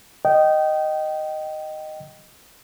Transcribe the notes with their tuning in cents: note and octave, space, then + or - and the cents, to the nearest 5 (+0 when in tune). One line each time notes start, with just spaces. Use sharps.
D#5 -5 G5 -20